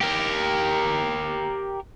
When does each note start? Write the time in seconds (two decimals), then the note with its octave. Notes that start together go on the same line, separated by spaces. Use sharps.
0.01 G4 A#4